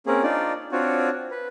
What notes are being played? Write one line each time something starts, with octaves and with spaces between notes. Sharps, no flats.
A#3 C4 C#4 G#4
D4 D#4 F4 D5
C4 D4 F4 F#4 C#5
B4